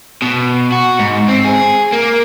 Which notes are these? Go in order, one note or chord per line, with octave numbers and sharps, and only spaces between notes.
B2
F#4
G#2
C4
G#4
A#3